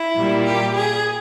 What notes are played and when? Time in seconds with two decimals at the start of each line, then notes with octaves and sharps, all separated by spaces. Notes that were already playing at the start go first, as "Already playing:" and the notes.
Already playing: E4
0.16 A#2 G3 A#3
0.45 G4
0.75 G#4